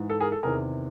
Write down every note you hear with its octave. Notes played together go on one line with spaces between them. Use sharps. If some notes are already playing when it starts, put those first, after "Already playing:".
Already playing: G#2 E3
A4
G#4 A#4
A4
E2 C3 D#3 G#4 A#4